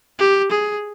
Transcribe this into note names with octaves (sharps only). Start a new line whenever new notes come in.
G4
G#4